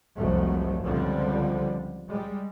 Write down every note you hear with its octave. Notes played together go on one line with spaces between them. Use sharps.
F1 C2 G#2 F3 F#3 A3
C#2 D3 F3 G3 C4
G3 G#3